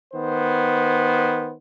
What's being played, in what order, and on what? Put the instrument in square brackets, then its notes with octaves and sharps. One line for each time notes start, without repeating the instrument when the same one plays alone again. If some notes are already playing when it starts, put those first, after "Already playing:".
[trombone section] D#3 B3 C5